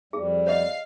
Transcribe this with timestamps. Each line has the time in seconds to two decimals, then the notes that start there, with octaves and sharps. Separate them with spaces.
0.13 F2 G3 G#4
0.47 C#5 D#5 F5 C7